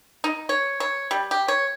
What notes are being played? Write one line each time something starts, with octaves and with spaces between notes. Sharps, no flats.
D#4
C#5
C#5
G3
G4
C#5